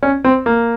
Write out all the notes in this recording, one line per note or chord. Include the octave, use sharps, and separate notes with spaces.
C#4
C4
A#3